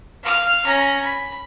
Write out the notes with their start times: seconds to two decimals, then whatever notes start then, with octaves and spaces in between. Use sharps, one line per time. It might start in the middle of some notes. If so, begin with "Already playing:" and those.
0.23 F5 F6
0.66 C#4 A#5
1.04 B5